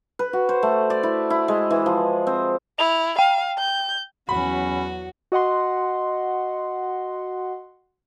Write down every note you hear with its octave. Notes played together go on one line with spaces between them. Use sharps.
B4
F#4
C5
A3
D5
E4
E4
G#3
E3
F3
C4
E4 F7
F5 G5
G6
E2 F#3 C#4 F#4 B5
F#4 D#5 F#5 C6